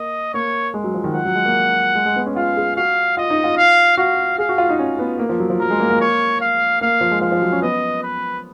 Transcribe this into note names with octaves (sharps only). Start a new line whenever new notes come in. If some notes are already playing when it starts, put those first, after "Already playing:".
Already playing: A#3 D#5
A#3 C#5
G#3
F#3
F3
D#3
F3 F#5
F#3
G#3
A#3
G#3
G#3
B3
C#4
F4 F5
G#4
F#4 F5
F4 D#5
D#4
F4
F5
F#4 F5
G#4 F5
F#4
F4
D#4
C#4
B3
A#3
F3
F#3
F3
F#3 A#4
G#3
A#3
A#3
C#5
F5
A#3 F5
F3
G#3
F3 F5
F3
F#3
C#4
B3 D#5
B4